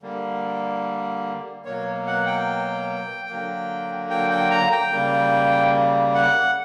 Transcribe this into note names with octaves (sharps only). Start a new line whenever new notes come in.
D3 G3 A#3
B2 F#3 A#3 C#5
F#5
G5
D3 F#3 A#3
G5
G5
A#5
G5
C#3 G3 A#3
F#5